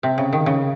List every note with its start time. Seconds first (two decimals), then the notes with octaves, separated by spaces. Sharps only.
0.03 C3
0.18 C#3
0.33 D#3
0.46 C#3